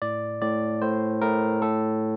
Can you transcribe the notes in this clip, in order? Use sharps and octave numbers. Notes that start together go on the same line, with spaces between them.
A2 D5
A2 D5
A2 C5
A2 A#4
A2 A4